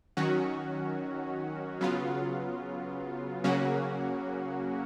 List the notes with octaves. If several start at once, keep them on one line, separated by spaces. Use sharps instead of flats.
D#3 F#3 C#4 F#4
C#3 F#3 B3 F4
C#3 F#3 A#3 C#4 F#4